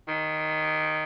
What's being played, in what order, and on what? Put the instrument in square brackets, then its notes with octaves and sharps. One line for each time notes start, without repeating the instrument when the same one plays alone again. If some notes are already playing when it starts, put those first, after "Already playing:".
[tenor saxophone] D#3